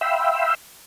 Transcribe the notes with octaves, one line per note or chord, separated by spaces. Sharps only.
E5 F5 G5 B5 C6 E6